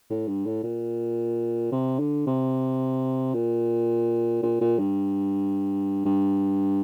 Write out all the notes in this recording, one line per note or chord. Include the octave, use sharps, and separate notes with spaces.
A2
G2
A2
A#2
C3
D3
C3
A#2
A#2
A#2
G2
G2